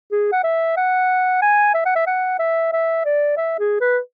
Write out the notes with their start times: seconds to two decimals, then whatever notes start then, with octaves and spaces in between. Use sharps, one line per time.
0.12 G#4
0.32 F#5
0.44 E5
0.77 F#5
1.42 G#5
1.74 E5
1.85 F#5
1.96 E5
2.07 F#5
2.39 E5
2.73 E5
3.05 D5
3.37 E5
3.59 G#4
3.81 B4